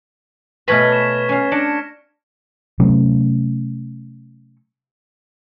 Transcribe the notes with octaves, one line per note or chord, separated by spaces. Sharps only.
B2 A3 B4 C#5 G#5 F6 G#6 A#6
C#6 B6 E7
C#4 F5
D4 A#6 C#7 D7
C3 F#3 A3 C#4